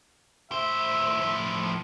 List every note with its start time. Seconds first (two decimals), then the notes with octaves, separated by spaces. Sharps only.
0.52 A2 C5 E5
1.21 A2 F3